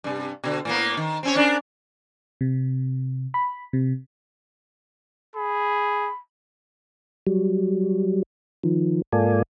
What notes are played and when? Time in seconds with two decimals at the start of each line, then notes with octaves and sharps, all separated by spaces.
0.04 G2 C3
0.44 B2 D3
0.65 A2 A#3 B3
0.97 D#3
1.23 C4 C#4 C#5
1.35 C#4 D4 A#4
2.41 C3
3.34 B5
3.73 C3
5.36 G#4 B5
7.27 F#3 G3
8.63 D#3 F3
9.12 G#2 A#3 F4 A4 D5 G#5